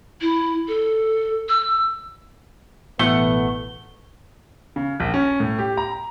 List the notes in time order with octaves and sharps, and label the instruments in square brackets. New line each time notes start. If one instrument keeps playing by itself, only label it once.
[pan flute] E4
A4
E6
[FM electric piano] A1 B2 E3 [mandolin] A3 F#5 [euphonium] B3 [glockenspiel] G7
[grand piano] C#3
A#1
C#4
A2
G4
A#5